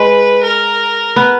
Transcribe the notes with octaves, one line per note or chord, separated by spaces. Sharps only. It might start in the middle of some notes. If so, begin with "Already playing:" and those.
Already playing: G#3 B4
A#4
B3